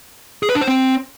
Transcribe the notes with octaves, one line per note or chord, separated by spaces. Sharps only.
G#4
B4
D4
C5
C4